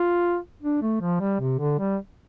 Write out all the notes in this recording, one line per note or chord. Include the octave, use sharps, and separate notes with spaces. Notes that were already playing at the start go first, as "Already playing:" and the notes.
Already playing: F4
D4
A3
F3
G3
C3
D3
G3